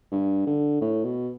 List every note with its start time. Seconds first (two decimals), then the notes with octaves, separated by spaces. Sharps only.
0.11 G2
0.47 D3
0.81 A2
1.04 B2